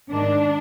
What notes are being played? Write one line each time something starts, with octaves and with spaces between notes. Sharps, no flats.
G#2 D#3 D4